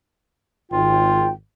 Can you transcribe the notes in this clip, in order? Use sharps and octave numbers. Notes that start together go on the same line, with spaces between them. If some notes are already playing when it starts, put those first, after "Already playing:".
G#1 F4 G5